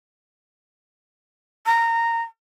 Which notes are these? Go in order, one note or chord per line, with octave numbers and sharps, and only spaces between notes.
A#5